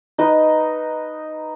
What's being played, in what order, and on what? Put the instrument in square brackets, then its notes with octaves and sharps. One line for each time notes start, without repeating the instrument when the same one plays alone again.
[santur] D#4 B4 D#5